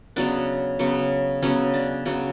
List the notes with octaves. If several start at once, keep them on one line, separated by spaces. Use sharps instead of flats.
C#3 F#3 B3 D4
C#3 F#3 B3
C#3 F#3 B3 C#4
D4
C#3 F#3 B3